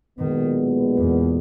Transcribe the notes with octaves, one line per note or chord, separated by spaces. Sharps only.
B1 A#2 D#3 G#3 B3
E2